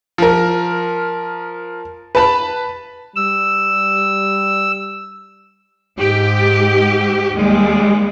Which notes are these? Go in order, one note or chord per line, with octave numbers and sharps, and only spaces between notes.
F3 A#4
B4 A5 B5
G3 E6
G#2 G4
D#2 G3 G#3